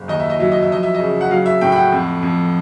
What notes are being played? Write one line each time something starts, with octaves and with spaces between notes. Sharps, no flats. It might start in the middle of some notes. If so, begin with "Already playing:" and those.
Already playing: F#1
D#2 D#5
E5
D#5
F#3 E5
D#5
E5
F3 D#5
E5
D#5
C#3
F#5
F#3 F5
E5
A2 G5
G5
F#5
F2
F2